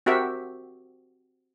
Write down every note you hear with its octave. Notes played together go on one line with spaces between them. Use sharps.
C4 F#4 G4 A#4 E5